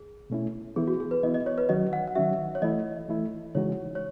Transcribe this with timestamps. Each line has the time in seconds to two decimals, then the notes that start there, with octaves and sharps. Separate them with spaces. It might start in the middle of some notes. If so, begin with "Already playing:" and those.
Already playing: G#4
0.30 B2 A3 C#4 E4
0.76 E3 B3 E4 G#4
0.87 F#4
1.00 G#4
1.11 B4
1.23 E3 B3 E4 D#5
1.34 D#5
1.46 C#5
1.58 B4
1.69 D#3 F#3 C#4 F#4 D#5
1.93 F#5
2.08 F#5
2.15 D#3 F#3 C#4 F#4 E5
2.55 C#5
2.62 E3 A3 E4 D#5
3.08 E3 A3 E4
3.55 C#3 E3 G#3 D#4 F#4 C#5
3.95 C#5